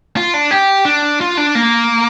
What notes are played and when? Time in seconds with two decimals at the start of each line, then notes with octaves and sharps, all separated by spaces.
0.17 F4
0.34 D4
0.51 G4
0.86 D4
1.21 F4
1.37 D4
1.55 A#3